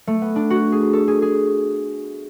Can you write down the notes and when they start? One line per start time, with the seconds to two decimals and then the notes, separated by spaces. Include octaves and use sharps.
0.07 A3
0.22 B3
0.36 D4
0.50 F#4
0.72 G#4
0.93 A4
1.08 G#4
1.22 G#4